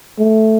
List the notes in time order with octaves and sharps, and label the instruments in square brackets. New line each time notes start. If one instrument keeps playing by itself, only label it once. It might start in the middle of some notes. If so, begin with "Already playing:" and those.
[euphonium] A3